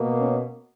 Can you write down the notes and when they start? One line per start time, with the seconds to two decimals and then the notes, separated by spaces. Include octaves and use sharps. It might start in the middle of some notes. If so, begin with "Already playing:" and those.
Already playing: B2 A#3
0.18 C#4